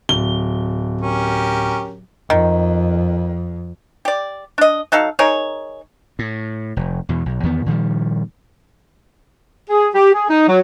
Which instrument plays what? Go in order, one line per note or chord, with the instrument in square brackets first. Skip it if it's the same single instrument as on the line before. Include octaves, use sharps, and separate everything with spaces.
[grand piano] D1 G7
[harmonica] C#4 G4 A#4
[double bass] F2 [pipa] D#3
[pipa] G4 D5
D4 D#5
F#3 D#4 A4 F5
D#4 G#4 A#4 C#5
[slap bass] A2
F1
E2 B2
B1
E2 D#3 B3
A#2 D#3 F3 G3
[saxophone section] G#4
G4
G#4
D#4
F#3